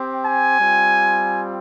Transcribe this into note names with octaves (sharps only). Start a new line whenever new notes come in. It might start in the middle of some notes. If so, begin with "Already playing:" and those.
Already playing: C4 G4
G#5
G3 C4 F4